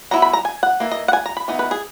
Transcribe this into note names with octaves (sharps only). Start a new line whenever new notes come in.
F#3 B3 E4 A#5
B5
A#5
G#5
F#5
E3 A#3
D#5
F#5
G#5
A#5
B5
E3 B3 D#4
B4
G#4